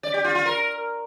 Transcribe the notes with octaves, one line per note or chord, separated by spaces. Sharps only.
D5
G4
F4
F4
A#4